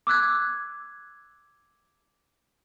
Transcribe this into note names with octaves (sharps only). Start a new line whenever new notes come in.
D6 E6 F#6 G#6